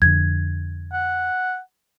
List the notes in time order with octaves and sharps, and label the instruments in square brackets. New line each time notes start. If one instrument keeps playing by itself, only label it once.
[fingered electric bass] F2 D3 [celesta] G#6
[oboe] F#5